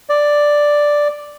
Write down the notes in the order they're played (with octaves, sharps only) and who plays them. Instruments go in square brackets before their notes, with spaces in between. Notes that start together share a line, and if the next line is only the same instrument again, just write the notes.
[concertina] D5